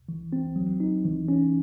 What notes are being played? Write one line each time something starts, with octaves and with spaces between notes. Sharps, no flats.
E3
C4
F#3
D#4
E3
C#4